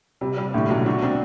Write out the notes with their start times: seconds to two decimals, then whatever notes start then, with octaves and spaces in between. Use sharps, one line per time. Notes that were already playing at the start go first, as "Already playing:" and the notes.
0.21 C3 G3
0.37 G3
0.54 A2 D3
0.70 B1 F#3
0.86 D4 F#4
1.02 C4 D4